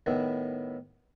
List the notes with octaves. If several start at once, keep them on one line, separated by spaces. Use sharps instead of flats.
A2 D#3 B3 E4